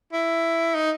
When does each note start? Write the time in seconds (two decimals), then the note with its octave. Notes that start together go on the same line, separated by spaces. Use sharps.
0.13 E4
0.74 D#4